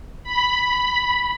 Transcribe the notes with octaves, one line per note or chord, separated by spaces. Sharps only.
B5